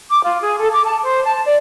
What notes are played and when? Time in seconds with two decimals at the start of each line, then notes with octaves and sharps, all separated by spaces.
0.10 D6
0.24 F4
0.41 G#4
0.59 A4
0.73 D6
0.85 A5
1.02 C5
1.25 A5
1.46 D5